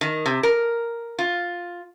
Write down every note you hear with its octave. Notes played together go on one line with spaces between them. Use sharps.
D#3
C3
A#4
F4